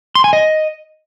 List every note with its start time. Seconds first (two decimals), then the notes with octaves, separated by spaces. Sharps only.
0.15 C6
0.24 G#5
0.33 D#5